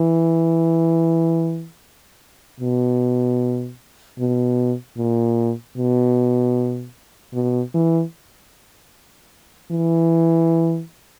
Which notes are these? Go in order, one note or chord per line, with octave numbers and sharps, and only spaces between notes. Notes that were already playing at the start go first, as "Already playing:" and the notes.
Already playing: E3
B2
B2
A#2
B2
B2
E3
E3